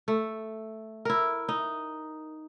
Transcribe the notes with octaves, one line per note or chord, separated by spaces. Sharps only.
A3
E4 A#4
D#4